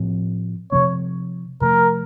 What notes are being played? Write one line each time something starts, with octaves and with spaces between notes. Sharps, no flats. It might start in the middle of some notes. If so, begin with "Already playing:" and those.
Already playing: A2 F3 C4
C3 F3 C4 C#5
C3 F3 A3 A#4